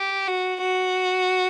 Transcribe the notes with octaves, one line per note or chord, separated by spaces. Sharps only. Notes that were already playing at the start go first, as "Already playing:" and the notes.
Already playing: G4
F#4
F#4